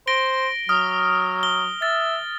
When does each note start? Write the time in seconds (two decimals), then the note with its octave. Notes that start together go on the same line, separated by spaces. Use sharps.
0.07 C5 A#6 D7 G7
0.69 F#3 D#6 F6
1.43 G7
1.82 E5 A6